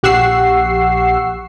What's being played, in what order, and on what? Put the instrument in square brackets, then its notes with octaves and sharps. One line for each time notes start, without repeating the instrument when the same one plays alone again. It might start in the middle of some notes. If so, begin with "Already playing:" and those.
[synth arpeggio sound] A#1 G4 F#5 C#6 E6 C7